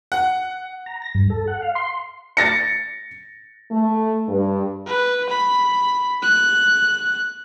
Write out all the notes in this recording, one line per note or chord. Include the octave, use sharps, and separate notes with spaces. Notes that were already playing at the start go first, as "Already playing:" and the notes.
F#5
A#5
A#6
G2
A4
F#5
F5
C6
A6 A#6 C#7
A3
G2
B4
B5
F#6